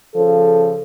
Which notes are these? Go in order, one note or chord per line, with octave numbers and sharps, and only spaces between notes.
C#3 F3 A4